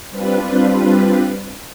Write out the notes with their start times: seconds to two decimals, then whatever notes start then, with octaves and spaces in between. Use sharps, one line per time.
0.11 G3 C4 D4 F4 B4